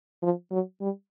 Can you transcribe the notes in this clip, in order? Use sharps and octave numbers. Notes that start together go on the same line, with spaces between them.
F3
F#3
G3